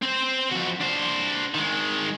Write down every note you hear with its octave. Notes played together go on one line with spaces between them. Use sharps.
C4 C5
F2 F#4
D4 C5
D#3 G#3